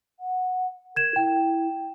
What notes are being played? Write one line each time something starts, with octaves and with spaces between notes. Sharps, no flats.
F#5
A#4 G#6 E7
E4 G5